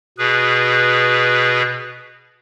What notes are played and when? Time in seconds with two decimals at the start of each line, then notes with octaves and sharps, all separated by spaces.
0.18 B2 G#4 B4